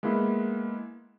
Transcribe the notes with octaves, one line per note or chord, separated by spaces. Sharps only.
G#3 A#3 B3 E4